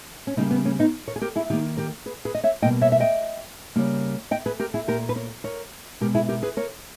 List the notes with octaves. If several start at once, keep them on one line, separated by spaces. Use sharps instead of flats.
C#4
C#3 G3 A#3 B3 D#4
B3
A#3 C#4
B3 D#4
A#4 C#5
G#4
G4 A#4
E4 G#4
D#3 A#3 D#4 G4
G4 A#4
G#4 B4
G#4 B4
D#5
C#5 E5
B2 G3 A#3 D#5 G5
C#5 E5
E5
D#5 G5
C#3 G3 A#3
D#5 G5
G#4 B4
G4 A#4
E4 G#4
A#2 A#3 G4 A#4
B4
A#4 C#5
A#4 C#5
B2 G#3 G4 A#4
E4 G#4
G4 A#4
G#4 B4
A#4 C#5